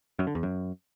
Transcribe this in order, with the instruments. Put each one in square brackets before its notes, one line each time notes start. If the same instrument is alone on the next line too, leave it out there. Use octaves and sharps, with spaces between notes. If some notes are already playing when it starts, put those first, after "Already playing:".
[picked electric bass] F#2
D3
E2
F#2